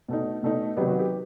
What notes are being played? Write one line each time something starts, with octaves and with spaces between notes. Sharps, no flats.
B2 A3 D#4
B2 A3 D#4
C3 D#3 F#3 B3 D#4 G4
F#4
G4